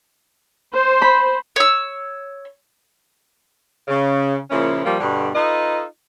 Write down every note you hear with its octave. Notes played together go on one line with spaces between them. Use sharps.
C5
B5
C#5 E6
C#3
A#2 C#3 F3 A#3 C#4 E4
F3 G3 A#3
G2 B2 D3
D#4 F4 A4 B4 D#5